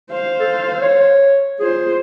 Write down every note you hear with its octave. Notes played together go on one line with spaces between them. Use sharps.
C5 F5
A4
C#5
F4 G#4 C5